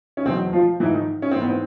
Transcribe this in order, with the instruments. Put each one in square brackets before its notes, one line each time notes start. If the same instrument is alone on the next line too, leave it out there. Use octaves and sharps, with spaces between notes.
[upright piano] C#4
E2 B2 F#3 C4
F3 F4
G#2 E3 F3 E4
D#3 D#4
C#4
C4
G#2 E3 B3
C4